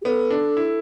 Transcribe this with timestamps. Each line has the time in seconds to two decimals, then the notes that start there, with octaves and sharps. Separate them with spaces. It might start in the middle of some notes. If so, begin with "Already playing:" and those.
0.02 G4
0.05 B3 A4
0.30 D4
0.57 E4